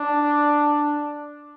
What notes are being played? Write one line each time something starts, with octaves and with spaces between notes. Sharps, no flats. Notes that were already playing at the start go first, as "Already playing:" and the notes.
Already playing: D4